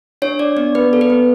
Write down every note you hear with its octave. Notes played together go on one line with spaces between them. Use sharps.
D4 C#5
D4 D5
B3 D5
B3 B4
A4
B4
B3